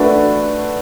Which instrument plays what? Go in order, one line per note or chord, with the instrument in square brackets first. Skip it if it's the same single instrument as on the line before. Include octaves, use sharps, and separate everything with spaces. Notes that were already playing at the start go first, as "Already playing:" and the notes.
Already playing: [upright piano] A3 D4 F#4 B4